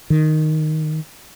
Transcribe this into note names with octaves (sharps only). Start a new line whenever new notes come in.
D#3